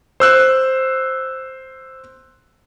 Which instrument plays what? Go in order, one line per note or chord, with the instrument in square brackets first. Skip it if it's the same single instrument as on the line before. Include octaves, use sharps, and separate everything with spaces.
[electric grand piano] C5 E6 F#6